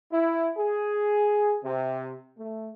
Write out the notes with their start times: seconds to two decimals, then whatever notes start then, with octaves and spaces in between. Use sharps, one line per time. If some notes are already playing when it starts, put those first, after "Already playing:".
0.12 E4
0.57 G#4
1.63 C3
2.37 A3